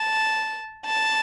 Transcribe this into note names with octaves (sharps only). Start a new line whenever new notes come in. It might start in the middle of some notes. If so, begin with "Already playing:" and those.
Already playing: A5
A5